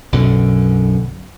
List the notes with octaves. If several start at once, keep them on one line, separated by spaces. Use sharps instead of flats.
B1 F#2 B2 D3